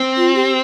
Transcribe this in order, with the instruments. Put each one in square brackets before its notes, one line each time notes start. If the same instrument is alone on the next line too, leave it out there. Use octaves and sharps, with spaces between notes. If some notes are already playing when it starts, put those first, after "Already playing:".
Already playing: [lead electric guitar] C4
[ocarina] F4
G4